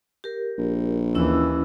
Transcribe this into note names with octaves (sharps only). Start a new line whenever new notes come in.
G4 A#4
A#1
D#2 E3 C#4 E4 E6